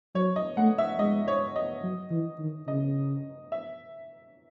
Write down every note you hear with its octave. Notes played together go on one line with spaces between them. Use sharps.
F#3 C#5
D#5
A3 F#5
E5
G#3 D#5
C#5
D#5
F#3
E3
D#3
C#3 D#5
E5